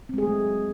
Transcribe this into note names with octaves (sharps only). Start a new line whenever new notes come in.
F#3 G#3 A3 C4 G#4